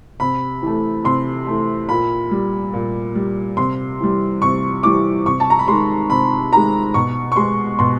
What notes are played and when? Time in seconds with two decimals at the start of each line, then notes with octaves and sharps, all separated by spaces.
0.20 C3 B5
0.62 E3 A3
1.04 C3 C6
1.47 E3 A3
1.89 A#2 B5
2.31 G3
2.74 A#2
3.15 G3
3.57 C3 C6
4.00 E3 G3
4.42 C3 C#6
4.83 E3 G3 D6
5.26 C3 C#6
5.40 A5
5.50 A#5
5.59 B5
5.68 D#3 G#3 C6
6.10 C3 B5
6.52 D#3 G#3 A#5
6.94 B2 C#6
7.32 C#6
7.36 G#3 C6
7.79 B2 C6